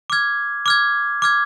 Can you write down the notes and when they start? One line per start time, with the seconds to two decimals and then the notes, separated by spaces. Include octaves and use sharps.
0.10 D6 F6 G#6
0.66 D6 F6 G#6
1.22 D6 F6 G#6